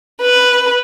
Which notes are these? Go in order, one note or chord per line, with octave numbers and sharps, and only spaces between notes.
B4